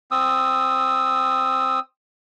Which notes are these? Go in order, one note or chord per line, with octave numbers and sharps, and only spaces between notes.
C4 D#6 E6